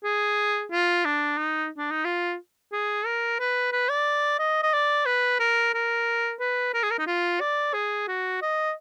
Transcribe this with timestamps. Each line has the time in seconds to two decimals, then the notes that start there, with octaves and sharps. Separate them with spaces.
0.04 G#4
0.72 F4
1.05 D4
1.38 D#4
1.78 D4
1.91 D#4
2.05 F4
2.72 G#4
3.06 A#4
3.40 B4
3.72 B4
3.89 D5
4.39 D#5
4.63 D#5
4.74 D5
5.06 B4
5.40 A#4
5.74 A#4
6.40 B4
6.74 A#4
6.83 G#4
6.91 A#4
6.99 D#4
7.07 F4
7.41 D5
7.74 G#4
8.08 F#4
8.42 D#5